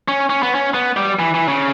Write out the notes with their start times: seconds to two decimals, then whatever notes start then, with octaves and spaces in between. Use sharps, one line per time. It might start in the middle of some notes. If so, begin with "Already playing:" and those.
0.08 C#4
0.30 C#4
0.43 B3
0.55 C#4
0.74 B3
0.97 G3
1.19 E3
1.34 E3
1.48 C#3